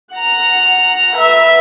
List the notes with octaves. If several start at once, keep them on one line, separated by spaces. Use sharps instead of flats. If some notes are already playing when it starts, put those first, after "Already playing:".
F#5 A#5
B4 E5